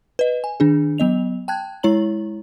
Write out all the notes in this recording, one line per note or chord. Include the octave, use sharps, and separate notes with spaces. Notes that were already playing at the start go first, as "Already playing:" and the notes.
B4 D#5
G#5
D#3 D4 G#4
F#3 B3 D#5 F7
G5 A5 F#6 G#6
G#3 E4 C#5 A#5 F#7